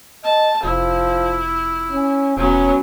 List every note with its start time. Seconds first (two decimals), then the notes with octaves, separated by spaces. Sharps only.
0.24 D#5 A5
0.64 F1 F3 E4
1.90 C#4
2.37 E1 F#3 B3 C#4